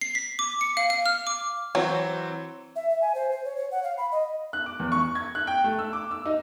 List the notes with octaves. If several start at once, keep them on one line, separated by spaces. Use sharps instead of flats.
C7
B6
D6
C#7
F5
F5
F6
D6
E3 F#3 C4
E5
E5
G#5
C5
C5
C#5
C#5
F#5
F5
B5
D#5
F#6
D6
E2
C#6
G#6
F#6
G5
A3
E6
D6
E6
D#4